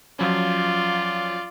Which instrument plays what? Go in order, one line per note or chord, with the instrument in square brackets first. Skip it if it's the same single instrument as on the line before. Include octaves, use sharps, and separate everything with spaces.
[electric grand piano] F3 F#3 C#4 [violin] F4 D5